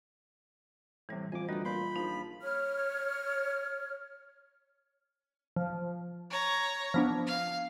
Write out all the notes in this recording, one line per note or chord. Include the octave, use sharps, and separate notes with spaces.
A2 C3 E3 G3
F2 C5 G#5 D6
D2 G3 D#4 A4 B4
A#2 B5 C6 G6
A#1 F3 D#4
C#5 F6
F3
C#5 A#5
F3 B3 D4
F5